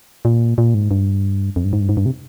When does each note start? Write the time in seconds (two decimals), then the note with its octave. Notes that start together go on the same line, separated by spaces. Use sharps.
0.25 A#2
0.58 A#2
0.74 G#2
0.91 G2
1.56 F2
1.65 G2
1.73 G#2
1.81 G2
1.89 G#2
1.97 G2
2.06 C3